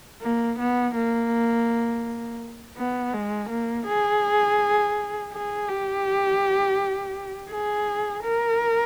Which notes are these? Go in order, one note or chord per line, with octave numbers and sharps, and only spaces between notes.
A#3
B3
A#3
B3
G#3
A#3
G#4
G#4
G4
G#4
A#4